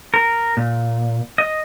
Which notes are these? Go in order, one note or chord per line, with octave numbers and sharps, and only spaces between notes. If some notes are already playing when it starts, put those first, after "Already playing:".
A#4
A#2
D#5